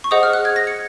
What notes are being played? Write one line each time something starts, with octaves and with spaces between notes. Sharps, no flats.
C#6
G#4 C5 D#5 F#5 D#6
F6
F#6
G#6
A#6
C#7